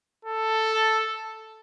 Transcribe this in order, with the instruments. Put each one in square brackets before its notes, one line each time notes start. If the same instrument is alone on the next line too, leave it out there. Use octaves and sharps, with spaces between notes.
[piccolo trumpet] A4